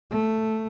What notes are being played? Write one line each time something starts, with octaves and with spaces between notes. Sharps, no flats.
A3